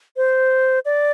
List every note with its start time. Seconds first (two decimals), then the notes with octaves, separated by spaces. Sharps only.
0.17 C5
0.85 D5